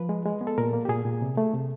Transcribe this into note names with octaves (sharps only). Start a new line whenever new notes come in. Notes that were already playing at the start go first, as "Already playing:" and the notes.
Already playing: F3 B4
G#3
G#3
B3
A4
A#2 A#4
A#3
G4
A#2 G#4
A#2
C3
A3
C3